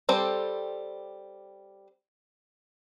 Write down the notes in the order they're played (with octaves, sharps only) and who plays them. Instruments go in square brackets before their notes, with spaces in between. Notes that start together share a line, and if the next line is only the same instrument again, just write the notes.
[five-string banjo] G3 C4 A4 C5 D5